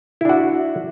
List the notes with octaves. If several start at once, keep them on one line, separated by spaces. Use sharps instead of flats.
D4 E4 F#4